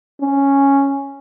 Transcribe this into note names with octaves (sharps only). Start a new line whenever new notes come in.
C#4